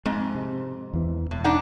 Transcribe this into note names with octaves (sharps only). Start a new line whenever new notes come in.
F2 G#2 G#3 C4
C3
E2 E3
E1 A2
D4 D#4 F#5